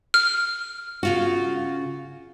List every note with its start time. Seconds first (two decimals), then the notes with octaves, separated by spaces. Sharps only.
0.14 F6
1.03 C#3 F4 F#4